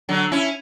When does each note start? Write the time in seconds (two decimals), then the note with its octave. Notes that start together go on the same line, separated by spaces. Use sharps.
0.09 D3 F#3
0.32 C#4 E4